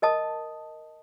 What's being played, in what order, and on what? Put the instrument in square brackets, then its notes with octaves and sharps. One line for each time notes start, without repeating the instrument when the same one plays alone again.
[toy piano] A#4 D#5 A5 D#6